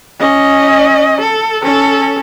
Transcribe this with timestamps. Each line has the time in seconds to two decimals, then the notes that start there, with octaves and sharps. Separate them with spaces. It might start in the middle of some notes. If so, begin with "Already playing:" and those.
0.19 C#4 D#5
1.21 A4
1.63 C#4 A4